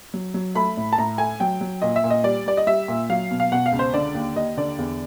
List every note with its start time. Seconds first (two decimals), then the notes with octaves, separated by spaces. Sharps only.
0.14 F#3
0.34 F#3
0.55 A3 B5
0.77 A2
0.93 A5
0.98 A2 A#5
1.18 A3 G#5
1.40 F#3 G5
1.61 F#3
1.82 A#2 D#5
1.96 E5
2.04 A#2
2.10 D#5
2.24 G3 D5
2.46 G3 D5
2.57 D#5
2.67 G3 E5
2.88 A#2
3.10 F#3 F5
3.31 B2
3.40 F5
3.52 B2 F#5
3.66 F5
3.72 C#2
3.79 C5
3.94 D3 D5
4.14 D#2
4.35 D#2 D#5
4.57 D3 D5
4.79 E2